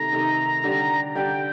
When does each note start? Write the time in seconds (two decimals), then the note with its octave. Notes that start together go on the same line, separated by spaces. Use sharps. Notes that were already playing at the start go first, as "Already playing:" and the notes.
Already playing: C3 D#3 A3 A#5
0.12 C3 D#3 A3
0.64 D3 G3 D4 G4
1.15 D3 G3 D4 G4 G5